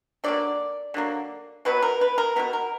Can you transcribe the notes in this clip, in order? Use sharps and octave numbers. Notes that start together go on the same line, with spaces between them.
D3 F#3 A#3 D5
D3 F#3 A#3
B2 F#3 B3 B4
A#4
B4
A#4
B2 F#3 B3 A#4
A#4